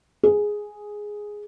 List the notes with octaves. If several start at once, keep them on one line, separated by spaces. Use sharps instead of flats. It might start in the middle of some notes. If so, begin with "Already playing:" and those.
G#4